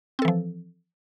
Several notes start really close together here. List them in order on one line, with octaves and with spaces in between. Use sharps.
C4 A4 E3 F3